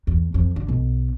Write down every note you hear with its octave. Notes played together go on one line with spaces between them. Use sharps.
E2
F2
D3
B1